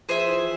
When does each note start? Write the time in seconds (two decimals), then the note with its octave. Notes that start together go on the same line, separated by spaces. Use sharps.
0.08 F3 G#4 C5 E5
0.27 E3